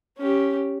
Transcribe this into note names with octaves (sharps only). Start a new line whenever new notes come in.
C#4 G4